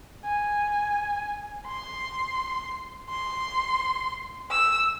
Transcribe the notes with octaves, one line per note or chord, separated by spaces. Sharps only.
G#5
C6
C6
E6